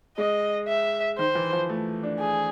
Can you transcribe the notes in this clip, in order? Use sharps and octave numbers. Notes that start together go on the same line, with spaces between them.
G#3 D#5
E5
D#3 C5
E3
F3
A3
D4
G#4